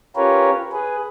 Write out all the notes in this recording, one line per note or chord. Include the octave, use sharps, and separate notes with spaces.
C#4 F4 G4 A#4 B4 C#5
G#4 B4